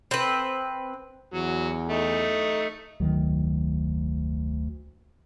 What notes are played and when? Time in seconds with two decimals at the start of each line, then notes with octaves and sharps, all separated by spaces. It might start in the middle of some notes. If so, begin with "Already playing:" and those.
0.11 C4 B4
1.34 E2 F#3
1.89 A3 D#4
3.00 F1 D2 D#3 F#3